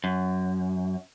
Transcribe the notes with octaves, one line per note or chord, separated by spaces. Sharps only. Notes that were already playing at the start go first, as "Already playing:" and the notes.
F#2